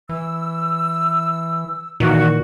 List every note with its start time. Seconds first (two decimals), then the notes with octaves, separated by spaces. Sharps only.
0.09 E3 E6
2.00 A#2 D#3 E3 F#4